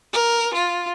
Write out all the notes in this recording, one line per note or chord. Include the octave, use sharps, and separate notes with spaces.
A#4
F4